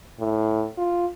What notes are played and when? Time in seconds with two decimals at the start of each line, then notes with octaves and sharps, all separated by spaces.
0.20 A2
0.78 F4